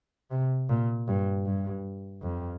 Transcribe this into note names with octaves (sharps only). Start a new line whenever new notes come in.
C3
A#2
G2
G2
F2